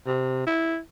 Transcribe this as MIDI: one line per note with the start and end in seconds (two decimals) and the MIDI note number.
0.07 0.43 48
0.47 0.79 64